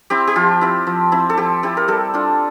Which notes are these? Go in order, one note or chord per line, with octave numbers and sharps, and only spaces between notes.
C4 E4 G4
G4
F3 F4
C4 E4
F3
C4 E4
A4
F3 G4
C4 E4 G4
A#4
G3 A4
D4 F4